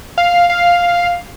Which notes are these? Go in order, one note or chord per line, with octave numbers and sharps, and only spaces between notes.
F5
F5